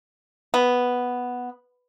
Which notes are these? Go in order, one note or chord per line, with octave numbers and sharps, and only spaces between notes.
B3